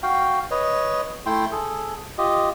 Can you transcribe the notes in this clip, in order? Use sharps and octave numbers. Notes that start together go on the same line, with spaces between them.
F#4 F5 G5
B4 C#5 D#5
A3 E4 G5 C6
G#4 A4
F4 G4 D#5